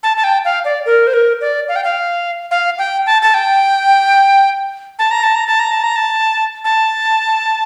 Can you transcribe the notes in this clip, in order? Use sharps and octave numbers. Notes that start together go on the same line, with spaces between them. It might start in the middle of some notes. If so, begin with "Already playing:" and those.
A5
A5
G5
F5
D5
A#4
C5
A#4
D5
F5
G5
F5
F5
G5
A5
A5
G5
A5
A#5
A5
A#5
A5
A#5
A5
A#5
A5
A5